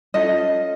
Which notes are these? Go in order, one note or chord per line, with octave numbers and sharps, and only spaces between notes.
C#4 F4 A4 D#5